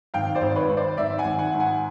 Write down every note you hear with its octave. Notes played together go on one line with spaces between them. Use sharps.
G#1 F5 G5
C5 D5
G#1
B4 C#5
G#1
C5 D5
G#1 D5 E5
F#5 G#5
G#1
F#5 G#5
G#2
F#5 G#5